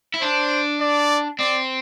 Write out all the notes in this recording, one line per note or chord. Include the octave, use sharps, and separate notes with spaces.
E4
D4 C5
D5
C4 D5